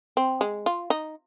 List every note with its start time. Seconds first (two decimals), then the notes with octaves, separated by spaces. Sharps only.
0.17 C4
0.41 G#3
0.66 F4
0.90 D#4